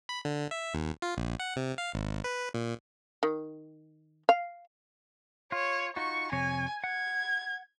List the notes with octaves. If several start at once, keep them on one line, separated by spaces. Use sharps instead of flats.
B5
D3
E5
D#2
F4
A#1
F#5
C3
F5
G#1
B4
A#2
D#3
F5
F4 C#5
D#4 F4 F#4 C#6
F2 C3 C#5 G#5
F#5 G#6